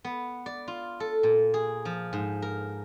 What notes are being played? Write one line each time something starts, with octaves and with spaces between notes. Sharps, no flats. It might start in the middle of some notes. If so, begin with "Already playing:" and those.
B3
D5
F4
A4
A#2
G#4
F3
G#2
A#4